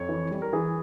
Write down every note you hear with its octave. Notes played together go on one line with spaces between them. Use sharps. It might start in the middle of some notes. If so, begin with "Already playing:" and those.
Already playing: F2 C#5
E3
G3
A#4
E3 G#4